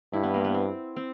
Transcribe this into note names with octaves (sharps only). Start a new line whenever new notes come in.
G2 E4
B3
A#3
B3
C4
C4